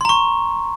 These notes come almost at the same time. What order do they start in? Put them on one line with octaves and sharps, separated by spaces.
C6 A#5 C#6